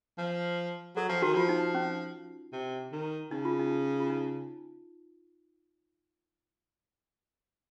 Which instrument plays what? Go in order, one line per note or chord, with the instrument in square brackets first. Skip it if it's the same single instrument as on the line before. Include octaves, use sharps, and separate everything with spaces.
[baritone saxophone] F3
[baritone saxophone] F#3 [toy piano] A4
[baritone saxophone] F3
[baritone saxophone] D#3 [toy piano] F#4
[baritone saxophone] F3 [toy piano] F4
[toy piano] D#4
C#4
[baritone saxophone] C3
D#3
[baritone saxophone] C#3 [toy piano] D#4
[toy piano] F4
D#4
F4
D#4